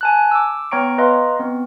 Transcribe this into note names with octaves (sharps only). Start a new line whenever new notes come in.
G#5 A5 F#6
D6 E6
B3 C#5 G5 A#5 C#6 D7
B4 D#5 F5 A#5 C6
B3 C4